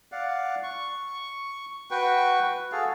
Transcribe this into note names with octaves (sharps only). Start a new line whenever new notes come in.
D5 F5 F#5
C#6
F#4 B4 G5 C#6
F#4 G#4 A4 F5